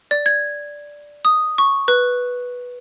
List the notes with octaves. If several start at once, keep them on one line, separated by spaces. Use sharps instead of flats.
D5
G#6
D#6
C#6
B4